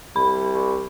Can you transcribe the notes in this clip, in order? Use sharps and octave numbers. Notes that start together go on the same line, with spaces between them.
C2 B5